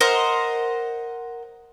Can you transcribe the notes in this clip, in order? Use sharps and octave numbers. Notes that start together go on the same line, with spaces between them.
A#4 C5 D#5 F#5